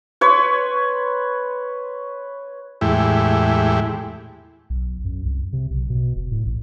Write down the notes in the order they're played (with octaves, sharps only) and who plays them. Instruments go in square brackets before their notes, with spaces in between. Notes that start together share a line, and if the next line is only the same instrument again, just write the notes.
[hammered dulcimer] B4 C#5 C6
[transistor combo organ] E2 A2 G#3 E4 G4
[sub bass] B1
F#2
C2
C3
B1
B2
E1
A2
A1